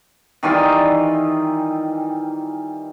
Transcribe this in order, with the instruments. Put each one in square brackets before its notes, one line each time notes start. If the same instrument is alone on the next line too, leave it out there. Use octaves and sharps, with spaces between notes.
[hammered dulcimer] D#3 E3 G3 F4